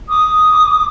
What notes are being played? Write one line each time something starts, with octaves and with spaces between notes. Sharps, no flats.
D6 D#6